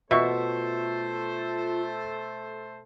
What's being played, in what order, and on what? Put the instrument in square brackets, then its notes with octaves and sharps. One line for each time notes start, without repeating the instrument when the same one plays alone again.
[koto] B2 [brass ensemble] A3 A4 C5 [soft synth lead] F4 [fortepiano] E5 C#6